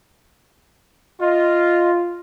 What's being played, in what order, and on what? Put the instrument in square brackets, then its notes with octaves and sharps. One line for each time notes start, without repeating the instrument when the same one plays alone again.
[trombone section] F4 [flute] D#5